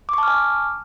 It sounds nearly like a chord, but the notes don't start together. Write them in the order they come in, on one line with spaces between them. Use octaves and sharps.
D6 C#6 A5 F6 G#5